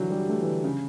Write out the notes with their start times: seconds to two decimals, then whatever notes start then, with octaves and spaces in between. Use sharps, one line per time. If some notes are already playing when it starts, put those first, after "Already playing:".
Already playing: D3 E3 F#3
0.10 G3
0.29 A3
0.42 E3
0.47 D3
0.64 C#3